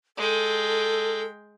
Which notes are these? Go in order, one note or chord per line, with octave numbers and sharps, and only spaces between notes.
G#3 A4 G5